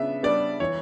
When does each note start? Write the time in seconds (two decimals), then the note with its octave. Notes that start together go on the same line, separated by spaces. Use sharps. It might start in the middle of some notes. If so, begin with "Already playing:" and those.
Already playing: C#3 B3 D4 E5
0.23 G3 B3 D4 D5
0.60 E3 C#5